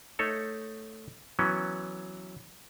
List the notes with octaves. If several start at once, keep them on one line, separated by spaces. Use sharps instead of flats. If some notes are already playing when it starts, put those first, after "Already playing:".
A3 D#4 A4 C#5
E3 F#3 B3 C#4